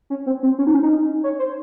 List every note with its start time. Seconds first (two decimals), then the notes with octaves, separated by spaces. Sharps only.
0.10 C#4
0.26 C4
0.43 C4
0.59 C#4
0.67 D#4
0.74 C#4
0.83 D#4
1.23 C#5
1.39 C5